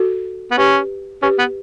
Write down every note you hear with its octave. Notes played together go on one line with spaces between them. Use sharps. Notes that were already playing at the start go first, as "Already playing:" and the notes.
Already playing: F#4 A4
B3
C#4 G4 B4
C#4 G4 B4
B3